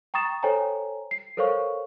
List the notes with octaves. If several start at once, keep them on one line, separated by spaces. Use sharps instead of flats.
G5 A#5 C#6 D#6 A6 E7
A4 C5 C#5 G5 G#5 A#5
C7
A4 A#4 C5 C#5 F5 C#6